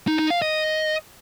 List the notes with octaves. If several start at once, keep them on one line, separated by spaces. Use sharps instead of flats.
D#4
D#4
F5
D#5